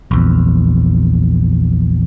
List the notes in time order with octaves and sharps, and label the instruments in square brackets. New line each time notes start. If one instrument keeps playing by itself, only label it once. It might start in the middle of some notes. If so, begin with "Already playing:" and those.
[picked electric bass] A#1 E2